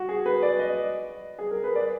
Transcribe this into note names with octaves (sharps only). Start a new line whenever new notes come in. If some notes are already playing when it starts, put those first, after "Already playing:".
Already playing: F#4
G#4
B4
D5
D#5
G#4
A#4
B4
D5